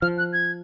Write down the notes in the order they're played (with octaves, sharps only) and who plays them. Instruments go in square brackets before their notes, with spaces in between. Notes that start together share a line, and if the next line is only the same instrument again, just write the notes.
[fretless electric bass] F3 [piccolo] F6
[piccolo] F#6
G#6